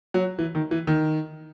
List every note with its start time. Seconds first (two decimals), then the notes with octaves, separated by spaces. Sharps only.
0.14 F#3
0.39 E3
0.55 D#3
0.71 E3
0.87 D#3